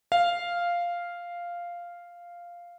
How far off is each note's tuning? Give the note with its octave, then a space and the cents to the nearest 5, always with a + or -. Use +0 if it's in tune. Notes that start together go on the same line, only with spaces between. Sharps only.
F5 -5